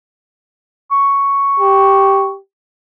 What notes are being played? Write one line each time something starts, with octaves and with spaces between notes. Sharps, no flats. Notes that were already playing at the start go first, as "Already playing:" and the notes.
C#6
G4